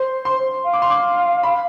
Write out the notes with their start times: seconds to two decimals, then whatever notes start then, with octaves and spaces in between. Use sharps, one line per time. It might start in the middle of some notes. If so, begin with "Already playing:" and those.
Already playing: C5 C6
0.25 C6
0.64 F5
0.73 D6
0.82 C6
0.90 D6
1.43 B5